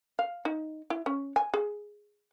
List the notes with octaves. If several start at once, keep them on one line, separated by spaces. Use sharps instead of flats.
F5
D#4
E4
C#4
G#5
G#4